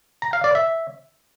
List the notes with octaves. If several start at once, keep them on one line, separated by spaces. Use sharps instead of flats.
A#5
F5
D5
E5